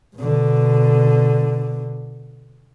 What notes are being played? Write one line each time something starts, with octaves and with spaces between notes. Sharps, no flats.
B2 D3